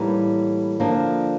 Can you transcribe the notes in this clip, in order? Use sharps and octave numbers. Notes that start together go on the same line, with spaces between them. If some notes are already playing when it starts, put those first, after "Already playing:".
Already playing: A2 E3 G3 A#3 D#4
D3 F3 A#3 D4